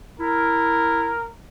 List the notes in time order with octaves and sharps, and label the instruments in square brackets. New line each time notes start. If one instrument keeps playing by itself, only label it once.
[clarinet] E4 [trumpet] A#4